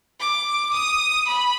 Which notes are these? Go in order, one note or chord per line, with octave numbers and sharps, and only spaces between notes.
D6
D#6
B5